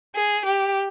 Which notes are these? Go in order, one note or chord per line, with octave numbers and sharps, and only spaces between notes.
G#4
G4